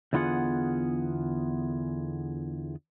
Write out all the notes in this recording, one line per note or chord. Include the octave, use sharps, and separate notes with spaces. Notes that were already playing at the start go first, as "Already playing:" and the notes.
E2 D3 B3 F4 G#4 F#5